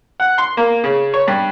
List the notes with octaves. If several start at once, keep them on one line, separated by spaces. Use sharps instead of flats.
F#5
C6
A#3
C#3
C#5
G2